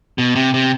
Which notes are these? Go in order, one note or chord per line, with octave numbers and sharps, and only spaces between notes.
B2
C3
C3